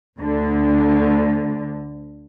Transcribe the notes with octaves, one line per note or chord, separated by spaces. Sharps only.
D2 D3